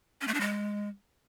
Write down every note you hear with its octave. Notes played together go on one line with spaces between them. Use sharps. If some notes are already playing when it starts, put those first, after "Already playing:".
C#4
A3
D4
G#3